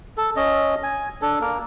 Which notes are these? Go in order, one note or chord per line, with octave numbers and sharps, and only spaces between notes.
A4
C#4 D#5
G#5
D4 A4
A#3 A#4